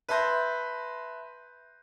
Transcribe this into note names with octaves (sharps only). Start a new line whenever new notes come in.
B4 E5 A5 C6 G6 A#6